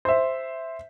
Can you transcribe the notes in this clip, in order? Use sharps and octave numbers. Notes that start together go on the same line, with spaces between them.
C5 E5